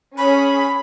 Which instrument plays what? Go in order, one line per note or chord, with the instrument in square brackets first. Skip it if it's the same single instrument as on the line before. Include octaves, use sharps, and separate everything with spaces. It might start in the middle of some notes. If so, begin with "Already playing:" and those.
[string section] C#4 G#4 [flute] B5